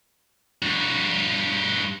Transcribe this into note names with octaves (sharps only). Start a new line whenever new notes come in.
G2 F#4